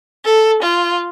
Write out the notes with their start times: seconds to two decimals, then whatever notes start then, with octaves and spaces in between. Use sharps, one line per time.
0.23 A4
0.62 F4